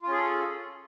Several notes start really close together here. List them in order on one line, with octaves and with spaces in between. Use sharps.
F4 C#4 G#4 A4